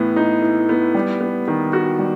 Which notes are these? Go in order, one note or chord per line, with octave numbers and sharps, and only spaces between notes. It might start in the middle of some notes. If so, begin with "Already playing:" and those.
Already playing: A2 E3 B3
D#4
E3
B3
G3
B3
D#3
F#4
G3